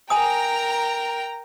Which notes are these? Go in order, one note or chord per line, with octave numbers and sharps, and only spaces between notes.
A#4 G5 G#5 A#5 D#6